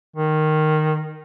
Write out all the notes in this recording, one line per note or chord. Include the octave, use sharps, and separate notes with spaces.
D#3